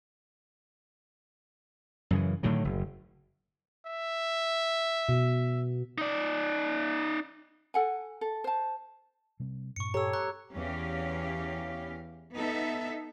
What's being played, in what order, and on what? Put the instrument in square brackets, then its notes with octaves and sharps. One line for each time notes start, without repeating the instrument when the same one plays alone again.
[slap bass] F#2 C#3 E3
A2 D3 D#3 F#3
F#1
[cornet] E5
[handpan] B2
[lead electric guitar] D#4 D5
[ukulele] A4 F#5 G#5
A4
C5 A5
[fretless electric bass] C3 G3 C4
[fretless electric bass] G2 A#2 [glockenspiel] C#6 C#7
[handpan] G4 A4 C#5 [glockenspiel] A#5 E6
[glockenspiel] A#5 C#6 F#6
[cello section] E2 E3 C#4 G4 F5
B3 D#4 A4 E5